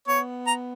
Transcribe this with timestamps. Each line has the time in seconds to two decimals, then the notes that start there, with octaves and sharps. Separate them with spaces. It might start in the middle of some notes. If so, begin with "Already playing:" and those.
0.08 B3 C#5
0.47 A#5